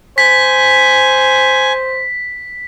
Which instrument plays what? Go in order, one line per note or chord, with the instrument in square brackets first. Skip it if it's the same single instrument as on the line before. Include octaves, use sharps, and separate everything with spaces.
[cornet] C5 [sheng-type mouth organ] G#5 [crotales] B6